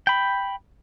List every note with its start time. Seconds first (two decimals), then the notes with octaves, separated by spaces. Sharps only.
0.07 G5 B5